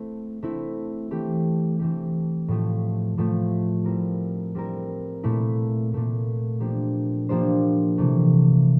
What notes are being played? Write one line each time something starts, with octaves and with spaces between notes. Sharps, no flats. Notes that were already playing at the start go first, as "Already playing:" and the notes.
Already playing: A3 C4 E4
A3 C4 E4
E3 A3 C4 G4
E3 A3 C4 G4
A2 F3 A3
A2 F3 A3
G3 C4 E4 A#4
G3 C4 E4 A#4
A#2 A3 E4
A#2 A3 E4
F3 A#3 D4 G4 C5
F3 A#3 D4 G4 C5
C3 E3 A3